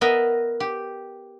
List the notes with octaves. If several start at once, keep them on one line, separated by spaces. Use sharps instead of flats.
B3 A#4 D#5 E5
G4